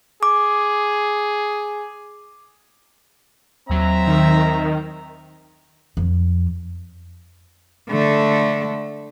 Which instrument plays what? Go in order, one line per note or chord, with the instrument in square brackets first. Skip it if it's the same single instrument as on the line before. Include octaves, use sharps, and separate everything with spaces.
[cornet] G#4 [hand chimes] D6
[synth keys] D#2 F#3 [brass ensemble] C4 E5 A#5
[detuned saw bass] D#3
[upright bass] F2
[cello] D3 A3